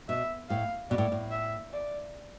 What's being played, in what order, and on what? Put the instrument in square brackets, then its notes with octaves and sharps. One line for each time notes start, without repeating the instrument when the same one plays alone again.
[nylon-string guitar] B2 [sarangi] E5
[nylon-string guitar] A2 [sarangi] F5
[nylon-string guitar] B2 [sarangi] D5
[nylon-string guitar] A2
A2
[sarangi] E5
D5